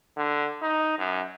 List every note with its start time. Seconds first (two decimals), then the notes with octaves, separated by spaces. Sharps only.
0.16 D3
0.62 D#4
0.98 F#2